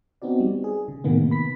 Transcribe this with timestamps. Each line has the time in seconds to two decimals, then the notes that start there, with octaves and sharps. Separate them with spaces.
0.22 B3 C4 D#4 F#4 D5
0.40 G3
0.64 G#4
0.88 C#3
1.04 A2 C3 D#3 A#3 B3
1.31 B5 B6